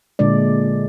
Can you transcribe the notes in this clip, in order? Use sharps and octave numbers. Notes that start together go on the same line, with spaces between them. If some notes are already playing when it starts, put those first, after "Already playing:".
A#2 D3 G#3 D5